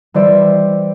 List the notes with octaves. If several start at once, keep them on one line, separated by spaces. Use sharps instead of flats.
E3 G3 C5 D5 E5